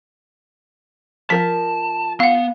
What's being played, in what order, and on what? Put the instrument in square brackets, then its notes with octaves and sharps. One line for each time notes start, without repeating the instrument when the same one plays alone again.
[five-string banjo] F3 A#4 [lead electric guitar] A5 [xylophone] B6
[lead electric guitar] B3 [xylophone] F5 F#5